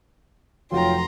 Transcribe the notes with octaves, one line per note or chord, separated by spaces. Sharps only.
F1 F#3 F4 C#5 G5 A#5 C6